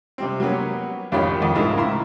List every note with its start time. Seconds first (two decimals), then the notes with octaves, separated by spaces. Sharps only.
0.18 C3 G3 C4
0.40 F#3 G3 A#3 B3 C#5
1.12 G#1 F2 D#3 G4 C#5 F5
1.40 F2 D#3
1.55 C#2 G#2 E4 G#4 A#4
1.77 A2 C#3 E4 A#5 C6